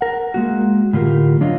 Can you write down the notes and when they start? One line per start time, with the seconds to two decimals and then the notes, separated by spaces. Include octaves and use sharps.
0.01 A#4 F#5
0.34 G#3 A#3 F#4
0.93 A2 D3 F4 G4 A#4
1.41 F#3 D4 F4 C#5 D#5